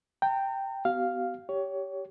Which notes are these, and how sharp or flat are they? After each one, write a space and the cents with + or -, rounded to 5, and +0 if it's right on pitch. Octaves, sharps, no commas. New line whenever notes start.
G5 +0 A#5 -40
B3 +30 F#4 +45 F5 +0
G4 -5 C#5 +20